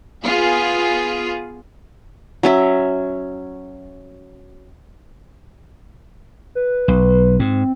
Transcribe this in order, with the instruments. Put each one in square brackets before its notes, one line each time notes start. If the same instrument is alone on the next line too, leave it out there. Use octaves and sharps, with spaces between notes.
[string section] B3 F4 G#4
[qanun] F#3 C#4 E5
[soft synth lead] B4
[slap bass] B1
[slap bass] G#2 [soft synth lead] C4